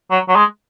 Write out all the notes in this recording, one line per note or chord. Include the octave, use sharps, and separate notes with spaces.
F#3
F#3
G#3